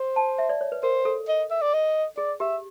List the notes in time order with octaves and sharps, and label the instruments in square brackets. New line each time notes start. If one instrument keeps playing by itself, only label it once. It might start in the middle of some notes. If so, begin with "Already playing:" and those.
Already playing: [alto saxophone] C5
[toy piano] A5
E5
D5
C#5
B4
[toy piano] A#4 [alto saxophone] C5
[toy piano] A4
[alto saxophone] D#5
E5
D5
D#5
[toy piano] G#4 [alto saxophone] D5
[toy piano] G4 [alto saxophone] E5